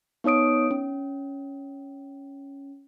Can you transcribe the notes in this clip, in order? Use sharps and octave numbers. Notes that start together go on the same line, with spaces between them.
B3 D#4 C#5 D#6 D7
C#4